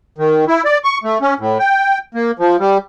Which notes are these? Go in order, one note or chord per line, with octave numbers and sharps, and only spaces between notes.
D#3
E4
D5
C#6
A3
C#4
A2
G5
A#3
F3
G3